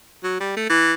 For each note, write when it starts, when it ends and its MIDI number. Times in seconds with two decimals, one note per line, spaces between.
0.24 0.36 54
0.40 0.56 55
0.56 0.65 57
0.70 0.93 52